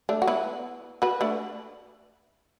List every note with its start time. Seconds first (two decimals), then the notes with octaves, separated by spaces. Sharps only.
0.09 A3 D4
0.22 F#4
0.27 B3 E4
1.02 F#4 B4
1.21 A3 D4